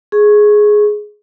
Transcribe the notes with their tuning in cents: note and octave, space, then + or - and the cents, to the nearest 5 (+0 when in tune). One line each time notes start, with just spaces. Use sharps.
G#4 +10 C#6 -15